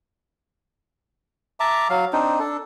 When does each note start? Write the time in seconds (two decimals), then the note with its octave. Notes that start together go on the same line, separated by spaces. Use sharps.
1.60 E5 A5 A#5 D6
1.90 F#3 F5
2.13 C4 D4 D#4
2.39 D4 A4